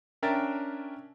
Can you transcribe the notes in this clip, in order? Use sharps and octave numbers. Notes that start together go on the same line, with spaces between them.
C#4 D4 A#4 E5 G5 A6